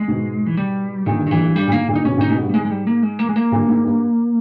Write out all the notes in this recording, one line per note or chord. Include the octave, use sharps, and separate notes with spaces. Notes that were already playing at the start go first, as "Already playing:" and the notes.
Already playing: G#3
G#2 B2
E3
G3
G2 A#2 D#3
G2
D#3
G2 A#2 E3
G2
G2 G3
A#2
G#2 A#3
G2 A#2
D#4
G#2 B2 C#4
A#2 C#3 D#4
G#2 B2 C#4
G2 B3
G3
G#2 G#3
G#3
G3
A#3
G#3
A#3
G#3
A#3
G2 A#2
G#2
G2